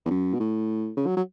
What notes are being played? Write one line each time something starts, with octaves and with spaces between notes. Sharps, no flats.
E2
F#2
B2
A2
C#3
F#3
F#3